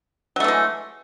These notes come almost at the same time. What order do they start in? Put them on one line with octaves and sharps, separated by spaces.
F#3 A3 E3 G#3